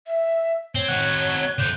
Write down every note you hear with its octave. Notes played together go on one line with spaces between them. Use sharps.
E5
C4 C#5 G7
C4 F#4 F#6
D3 C4 G6